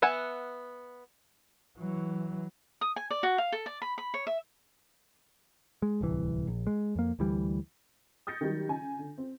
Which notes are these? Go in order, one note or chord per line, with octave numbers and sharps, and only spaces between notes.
B3 E5 F#5 G#5
E3 F#3
D#6
G#5
D5
F#4
F5
A4
D5
B5
B5
C#5
E5
G#3
D1 C2 E3
A#1
G#3
F2 A#3
D2 E3 G3
D#6 G6 A6 A#6 C#7
D#3 F#3 G3
C#3 G#5
D3
C4